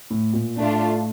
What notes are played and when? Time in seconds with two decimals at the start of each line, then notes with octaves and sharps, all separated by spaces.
0.10 A2
0.33 A#2
0.57 A2 A3 D4 F4